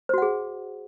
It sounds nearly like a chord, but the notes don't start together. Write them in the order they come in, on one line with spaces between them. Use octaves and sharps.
C5 F#4 F#5 G#4